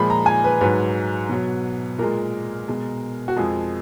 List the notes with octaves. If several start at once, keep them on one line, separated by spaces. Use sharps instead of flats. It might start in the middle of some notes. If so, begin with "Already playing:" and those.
Already playing: A#2 F3 G#3 B5
A#5
G#5
B4
G#2 F#3 B4
B2 F#3
A#2 G#3 A#4
B2 G#3
F#4
F2 F3 G#3 G#4